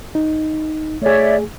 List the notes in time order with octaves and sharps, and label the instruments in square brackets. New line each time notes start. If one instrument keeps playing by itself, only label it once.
[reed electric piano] D#4
[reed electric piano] A3 G#4 [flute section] C#5 D5 E5